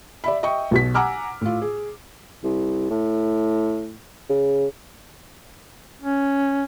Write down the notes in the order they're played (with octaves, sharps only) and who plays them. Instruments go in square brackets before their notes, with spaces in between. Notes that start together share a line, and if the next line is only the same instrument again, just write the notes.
[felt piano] D5 E5 B5
D#5 E5 G5 C#6
B1 B2 B6
F#5 G#5 A#5 D6 E6 F6
A2 F4
G#4
[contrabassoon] C2
A2
C#3
[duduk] C#4